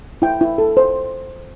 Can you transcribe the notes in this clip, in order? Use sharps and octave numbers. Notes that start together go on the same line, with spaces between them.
E4 G5
E4
A4
C5